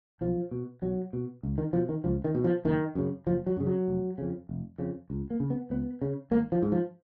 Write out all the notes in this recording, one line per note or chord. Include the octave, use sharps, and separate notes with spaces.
B1 F3
B2
B1 F#3
B2
C#2
D#3
B2 F3
D#3
C#2 F3
D#3
B2
F3
F#1 D#3
F#2 C#3
F#1 F3
F#3
F#2 C#3
F#3
F1
F2 C#3
F1
F2 C#3
C#2
A#3
C#3
B3
C#2 B3
C#3
G#1 A#3
F3
G#2
F3